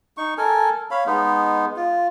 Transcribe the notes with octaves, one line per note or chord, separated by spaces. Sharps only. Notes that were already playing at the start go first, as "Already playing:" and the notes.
D#4 C#6
A4 A#4 G#5
C#5 F5 B5
G#3 B3 D#4
F4